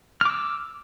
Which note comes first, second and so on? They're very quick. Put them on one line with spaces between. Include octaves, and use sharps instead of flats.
F6 D6 E6